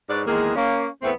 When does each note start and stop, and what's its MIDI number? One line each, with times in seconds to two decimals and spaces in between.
0.09 0.21 44
0.09 0.21 71
0.09 0.21 73
0.09 0.21 74
0.27 0.51 40
0.27 0.51 51
0.27 0.51 56
0.27 0.51 58
0.27 0.51 68
0.56 0.87 58
0.56 0.87 61
1.02 1.11 40
1.02 1.11 57
1.02 1.11 59
1.02 1.11 60